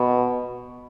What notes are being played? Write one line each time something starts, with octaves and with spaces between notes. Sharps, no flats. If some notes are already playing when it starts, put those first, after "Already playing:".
Already playing: B2